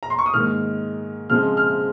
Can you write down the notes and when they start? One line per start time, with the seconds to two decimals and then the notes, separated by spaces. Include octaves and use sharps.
0.03 A#5
0.10 C6
0.19 C#6
0.26 D#6
0.33 G#2 D#3 A#3 F6
1.30 C#3 F3 G#3 C4 F6
1.57 F6